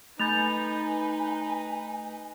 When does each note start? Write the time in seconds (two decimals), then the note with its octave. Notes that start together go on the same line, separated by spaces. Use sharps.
0.20 A3 D#4 B4 G#5 B5 G6 A6 F7